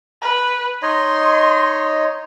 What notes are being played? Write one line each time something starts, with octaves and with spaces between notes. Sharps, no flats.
B4
D#4 C#5 D#5 C6